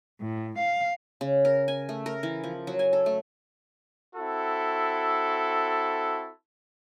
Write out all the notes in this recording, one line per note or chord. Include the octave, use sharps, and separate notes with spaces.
A2
F5
C#3
A#4
G#5
A3
A#4
E3
F3
F#3
G#5
A4
A3
C4 E4 F#4 A4